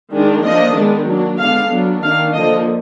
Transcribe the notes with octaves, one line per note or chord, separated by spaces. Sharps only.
D#3 G#3 D4
F3 A#3 D4 D#5
D#3 G#3 B3 D4
F#3 A#3 D4
D3 G#3 B3 D4 F5
F#3 B3 D4
D#3 A#3 D4 F5
D3 F3 A#3 D#5